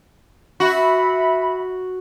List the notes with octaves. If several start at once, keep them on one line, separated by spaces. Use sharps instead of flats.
F#4 E5 B5